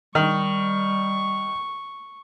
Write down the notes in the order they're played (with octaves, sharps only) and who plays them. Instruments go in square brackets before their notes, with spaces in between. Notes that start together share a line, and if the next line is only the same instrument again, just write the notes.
[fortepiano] D#3 [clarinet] G3 [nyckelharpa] C#6